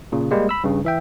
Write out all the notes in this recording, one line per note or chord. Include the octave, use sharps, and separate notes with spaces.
A#2 C#3
G3 G#3 A#3
B5 E6
G2 C#3
E3 E5 G5